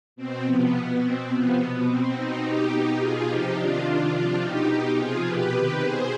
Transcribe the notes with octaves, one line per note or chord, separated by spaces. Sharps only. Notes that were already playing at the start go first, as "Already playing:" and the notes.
B2 C4
C3 F3 B3
B2
B2 C4
C3 F3 B3
B2
B2 C4
B2 C4 D#4
B2 D#4 G4
B2
B2 F4 G#4
C3 F3 D#4 G4
C3 D#3 D4 F4
C3 D#3
C3 F3 D4 F4
B2 D#4 G4
B2
C3 F3 F4 G#4
B2 G4 B4
C3 D#3
B2 G#4 C5